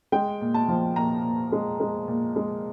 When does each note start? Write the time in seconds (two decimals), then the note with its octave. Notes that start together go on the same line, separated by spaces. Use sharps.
0.12 G#3 G5
0.41 A#2
0.54 A5
0.68 F3
0.96 A#2 A#5
1.24 A#2
1.52 G#3
1.80 G#3
2.08 A#2
2.36 G#3